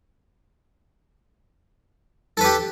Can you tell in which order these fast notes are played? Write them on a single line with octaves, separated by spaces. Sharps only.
A4 B4 G4